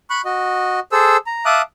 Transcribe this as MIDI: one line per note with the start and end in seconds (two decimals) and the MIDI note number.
0.10 0.22 83
0.10 0.22 85
0.10 0.22 90
0.25 0.80 66
0.25 0.80 75
0.92 1.17 68
0.92 1.17 69
0.92 1.17 72
0.92 1.17 88
1.26 1.45 82
1.45 1.62 76
1.45 1.62 77
1.45 1.62 81
1.45 1.62 86
1.45 1.62 87
1.45 1.62 90